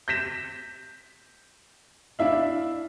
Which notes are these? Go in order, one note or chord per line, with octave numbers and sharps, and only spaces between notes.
G6 A#6 B6 E7
D4 E4 E5 F5